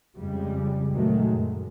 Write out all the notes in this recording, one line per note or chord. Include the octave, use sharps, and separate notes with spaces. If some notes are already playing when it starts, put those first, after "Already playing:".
F2 C#3 G3 G#3
D2 A#2 D#3 F#3 G#3 A3
F#2